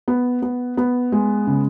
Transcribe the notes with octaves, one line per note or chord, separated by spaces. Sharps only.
B3
B3
B3
G#3
C#3